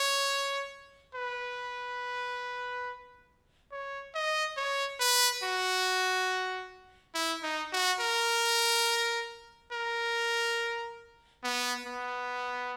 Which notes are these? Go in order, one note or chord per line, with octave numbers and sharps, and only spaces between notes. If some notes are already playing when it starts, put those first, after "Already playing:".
Already playing: C#5
B4
C#5
D#5
C#5
B4
F#4
E4
D#4
F#4
A#4
A#4
B3
B3